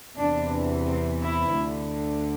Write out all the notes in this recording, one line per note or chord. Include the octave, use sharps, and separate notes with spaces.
E2 C3 E3 D4
C4
E4
D2 D3